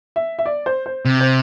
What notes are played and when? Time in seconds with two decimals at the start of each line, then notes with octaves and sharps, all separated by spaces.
0.16 E5
0.39 E5
0.46 D5
0.66 C5
0.86 C5
1.05 C3
1.20 C5